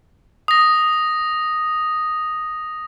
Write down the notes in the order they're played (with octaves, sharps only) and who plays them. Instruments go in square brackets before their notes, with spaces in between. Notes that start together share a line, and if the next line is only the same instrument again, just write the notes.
[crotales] D#6 A#6